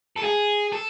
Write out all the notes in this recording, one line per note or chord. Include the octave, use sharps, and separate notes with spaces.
A4
G#4
A4